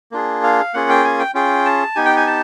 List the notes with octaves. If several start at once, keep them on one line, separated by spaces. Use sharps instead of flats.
A#3 D4 F4 G#4
F5
A#3 C#4 F4 G#4 F#5
G5
G#5
G5
C#4 F4 G#4 G5
A5
B3 D#4 G4 G#5
G5
G#5
A5